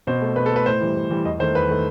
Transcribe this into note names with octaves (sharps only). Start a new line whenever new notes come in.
B2 C5
A3
B2 B4
A4
A3 B4
A2 C5
E3 G3
A2
E3 G3
E2 D#5
D#3 A3 C5
E2 B4
D#3 A3